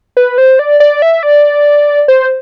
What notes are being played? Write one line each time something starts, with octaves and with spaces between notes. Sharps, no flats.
B4
C5
D5
D5
E5
D5
C5